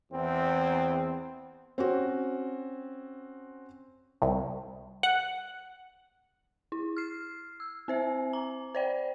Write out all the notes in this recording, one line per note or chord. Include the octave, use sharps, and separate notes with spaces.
E2 C4
C4 C#4 F#4
C2
F#5
E4
F6 C7
E6
C4 C5 E5
A#5
C5 D5 G5